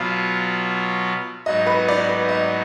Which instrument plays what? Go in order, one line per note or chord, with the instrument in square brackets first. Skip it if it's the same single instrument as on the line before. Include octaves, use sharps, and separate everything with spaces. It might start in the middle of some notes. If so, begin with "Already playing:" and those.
Already playing: [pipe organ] B2 F#3 B3 F4 [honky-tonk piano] F5
[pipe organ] G#2 F#3 B3 D#4 [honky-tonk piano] D#5
[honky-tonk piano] B4
D5
B4
D#5